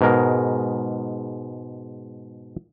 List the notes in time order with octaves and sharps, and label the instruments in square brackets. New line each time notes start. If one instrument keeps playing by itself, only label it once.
[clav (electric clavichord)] G#2 B2 G#3 A#4